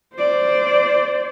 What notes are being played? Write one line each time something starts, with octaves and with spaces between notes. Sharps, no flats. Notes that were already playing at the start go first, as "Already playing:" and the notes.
C5 D5